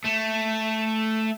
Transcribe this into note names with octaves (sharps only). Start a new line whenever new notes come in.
A3